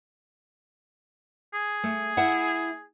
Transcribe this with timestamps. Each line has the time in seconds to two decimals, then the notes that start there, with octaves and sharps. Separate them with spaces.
1.53 G#4
1.84 A3
2.17 E4 E5 F#5